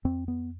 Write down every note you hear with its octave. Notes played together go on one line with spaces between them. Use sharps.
F2 C4
B3